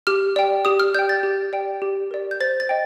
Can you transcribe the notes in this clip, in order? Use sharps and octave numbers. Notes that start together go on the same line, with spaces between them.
G4 F6
D5 G5
G4 D#6
F6
D5 G5 G6
A6
G4
D5 G5
G4
A#4 D5
G6
C5 A6
A6
D#5 G5